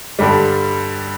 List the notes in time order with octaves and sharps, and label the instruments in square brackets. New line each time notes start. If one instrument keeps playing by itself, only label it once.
[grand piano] G2 D3 G3